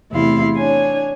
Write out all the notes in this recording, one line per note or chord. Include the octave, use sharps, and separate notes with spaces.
E2 C3 A3 E4 F5 C6
D4 C#5 G#5